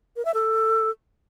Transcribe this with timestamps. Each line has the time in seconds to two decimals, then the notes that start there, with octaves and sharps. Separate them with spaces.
0.16 A#4
0.25 E5
0.34 A4